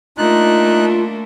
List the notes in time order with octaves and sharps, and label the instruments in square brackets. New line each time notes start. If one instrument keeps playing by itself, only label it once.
[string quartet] A3 A#3 D4 [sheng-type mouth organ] D#4 F#6 [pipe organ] F4